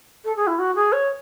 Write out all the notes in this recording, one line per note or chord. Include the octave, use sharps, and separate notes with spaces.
A4
G#4
E4
F#4
G#4
C#5